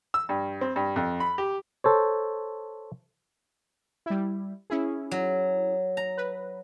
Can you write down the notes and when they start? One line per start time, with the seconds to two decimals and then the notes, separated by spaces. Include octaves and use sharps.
0.14 E6
0.29 G2
0.61 C4
0.76 G2
0.96 F2
1.20 B5
1.38 G4
1.84 A4 C5 C#5
4.06 G3 E4
4.70 C#4 E4 G#4
5.11 F#3
5.97 A#5
6.17 B4